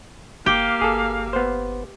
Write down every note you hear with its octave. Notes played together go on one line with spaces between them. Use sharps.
F#1 A#3 G4 F5
G1 G#4 A4
B3 C5